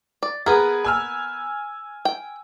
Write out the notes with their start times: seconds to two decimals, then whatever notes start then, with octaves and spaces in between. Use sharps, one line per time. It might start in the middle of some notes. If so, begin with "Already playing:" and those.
0.23 D5
0.46 B3 G#4 A#4 B4
0.84 G#5 E6 F6
2.05 G5